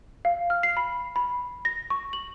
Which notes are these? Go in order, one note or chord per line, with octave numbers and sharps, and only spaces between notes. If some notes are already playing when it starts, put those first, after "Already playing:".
F5
F6
C7
B5
B5
A#6
C#6
F#7